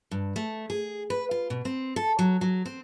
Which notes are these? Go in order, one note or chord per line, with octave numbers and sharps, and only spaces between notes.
G2
A3
G#4
B4
F4
B2
C4
A4
F#3
F#3
C4